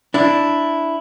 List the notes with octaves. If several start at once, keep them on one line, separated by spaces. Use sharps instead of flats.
D4 E4